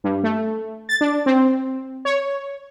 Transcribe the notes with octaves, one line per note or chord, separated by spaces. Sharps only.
G2
A3
A6
D4
C4
C#5